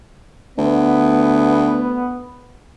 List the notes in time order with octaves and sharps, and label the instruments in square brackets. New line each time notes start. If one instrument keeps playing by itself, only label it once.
[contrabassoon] D2 [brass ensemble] B3